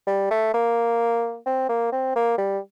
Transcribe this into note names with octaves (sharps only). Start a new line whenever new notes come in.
G3
A3
A#3
C4
A#3
C4
A#3
G3